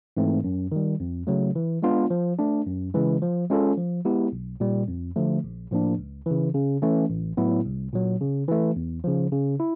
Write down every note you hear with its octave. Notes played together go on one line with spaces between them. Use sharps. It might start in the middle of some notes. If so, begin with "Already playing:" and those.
G#2 E3 A3 C4
F#2
D#3 G3
F2
C#3 F#3 A3
E3
G#3 B3 D4 F4
F3
A3 D4
F#2
C#3 E3 G#3
F3
G#3 C#4 F4 A4
F3
G#3 B3 E4 G4
B1
A#2 G3
F2
D3 F3 A3
A#1
A2 F3 A#3 D4
C#2
C#3 E3
C#3
E3 A3 C#4
A1
A2 F#3 B3 E4
C2
A#2 F#3
C#3
E3 A3
E2
C#3 F3
C#3
E4